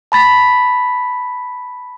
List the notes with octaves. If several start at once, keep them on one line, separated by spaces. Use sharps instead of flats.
A5 B5 A6 B6